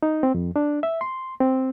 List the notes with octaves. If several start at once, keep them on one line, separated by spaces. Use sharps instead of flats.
D#4
C4
F2
D4
E5
C6
C4